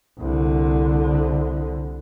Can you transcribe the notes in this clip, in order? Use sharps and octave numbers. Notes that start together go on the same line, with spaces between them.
C2 D3